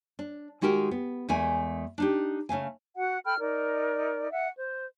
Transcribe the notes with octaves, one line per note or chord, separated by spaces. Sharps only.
D4
D#3 G#3 F#4 G4 A4 A#4
B3
E2 G#3 A3 A#4 G#5
D4 D#4 G4
C#3 A3 F5 G#5
F#4 F#5
A4 G5 B5 F6
D#4 A#4 D5
E5 F#5
C5